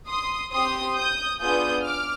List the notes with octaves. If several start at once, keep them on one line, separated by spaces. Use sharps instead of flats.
C6 D#6
C4 G4 C6 D#6
D#6 G6
B3 D4 F4 G#4 D#6 G6
D6 F6